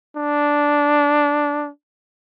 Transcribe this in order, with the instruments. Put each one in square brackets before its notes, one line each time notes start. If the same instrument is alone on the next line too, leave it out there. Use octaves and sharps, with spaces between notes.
[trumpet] D4